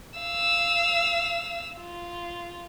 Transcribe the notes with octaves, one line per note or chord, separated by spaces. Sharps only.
F5 E6
F4